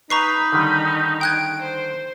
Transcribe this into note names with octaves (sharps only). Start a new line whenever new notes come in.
D#4 B4 A#5 B5 C#6 C7
D3 D#3 G3
G5 F#6 G#6 D7
C5